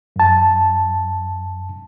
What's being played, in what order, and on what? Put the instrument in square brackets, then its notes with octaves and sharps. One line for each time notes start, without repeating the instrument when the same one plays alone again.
[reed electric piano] F#2 A5